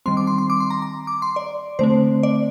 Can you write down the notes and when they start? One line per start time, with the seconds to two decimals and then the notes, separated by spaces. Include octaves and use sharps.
0.06 D#3 G3 C4 C6
0.17 D6
0.27 C6
0.38 C6
0.50 D6
0.60 C6
0.70 A#5
0.82 A#5
1.07 D6
1.22 C6
1.36 D5
1.79 D3 A3 C4 C5
2.23 D5